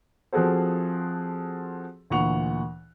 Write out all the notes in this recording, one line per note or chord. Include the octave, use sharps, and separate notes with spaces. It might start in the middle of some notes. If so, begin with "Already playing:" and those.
F3 C4 F#4 G#4 A4 C5
D2 A#2 E3 F#5 C#6 F7